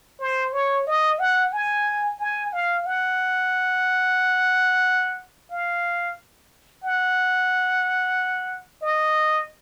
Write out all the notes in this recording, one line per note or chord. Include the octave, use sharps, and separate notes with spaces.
C5
C#5
D#5
F#5
G#5
G#5
F5
F#5
F5
F#5
D#5